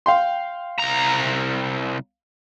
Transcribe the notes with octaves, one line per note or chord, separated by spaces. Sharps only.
F5 G5 C6
C2 A#5